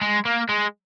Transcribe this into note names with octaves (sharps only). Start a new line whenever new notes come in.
G#3
A#3
G#3